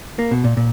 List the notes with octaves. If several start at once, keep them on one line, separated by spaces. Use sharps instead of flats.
A#3
B2
A#2
A#2